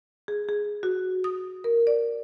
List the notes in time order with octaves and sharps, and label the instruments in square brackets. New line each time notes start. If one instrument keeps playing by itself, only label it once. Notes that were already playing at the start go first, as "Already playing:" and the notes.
[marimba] G#4
G#4
F#4
D#6
A#4
D5